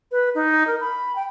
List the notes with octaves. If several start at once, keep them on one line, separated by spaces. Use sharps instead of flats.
B4
D#4
A#4
B5
G5